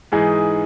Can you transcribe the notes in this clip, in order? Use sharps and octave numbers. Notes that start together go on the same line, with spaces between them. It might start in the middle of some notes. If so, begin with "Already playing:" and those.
G#2 E3 G#3 D#4 G#4